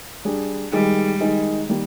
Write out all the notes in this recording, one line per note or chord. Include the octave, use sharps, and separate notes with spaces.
G3 D4 G#4
D#3 G3 G#3 D#4 G#4
D#3 G#3 D#4 G#4
D#3 G3 A#3